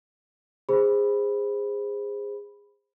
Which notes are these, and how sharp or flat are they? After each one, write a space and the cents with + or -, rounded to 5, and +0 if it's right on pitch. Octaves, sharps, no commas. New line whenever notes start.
G#4 -25 C5 +0 B5 +0